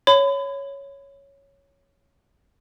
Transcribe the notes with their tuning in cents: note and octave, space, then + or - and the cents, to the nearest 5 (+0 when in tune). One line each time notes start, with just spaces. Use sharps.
C#5 +0 B5 +35